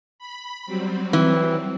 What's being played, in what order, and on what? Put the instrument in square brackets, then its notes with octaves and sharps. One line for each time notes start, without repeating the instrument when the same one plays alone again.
[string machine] B5
F#3 G3 C4
[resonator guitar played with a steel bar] E3